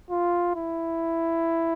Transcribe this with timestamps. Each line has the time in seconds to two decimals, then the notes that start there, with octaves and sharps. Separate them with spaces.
0.11 F4
0.56 E4